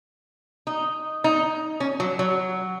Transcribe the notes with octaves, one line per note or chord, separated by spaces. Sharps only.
D#4
D#4
C#4
F#3
F#3